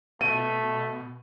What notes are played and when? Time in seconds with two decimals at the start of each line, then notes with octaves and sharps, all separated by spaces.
0.21 B2 A3 D#7